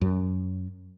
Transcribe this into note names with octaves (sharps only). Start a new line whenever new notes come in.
F#2